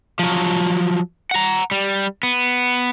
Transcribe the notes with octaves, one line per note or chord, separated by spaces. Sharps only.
F3 F#3
F#5 A#5
G3
B3